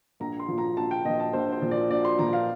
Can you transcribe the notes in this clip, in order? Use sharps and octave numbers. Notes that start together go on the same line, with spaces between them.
A#1 A#5
C6
A#2 F3
A#5
A#1 A5
G5
A#2 F3 D#5
A5
A#1 C5
C5
A#2 F3
D5
A#1 D5
C6
A#2 F3 A#5
F5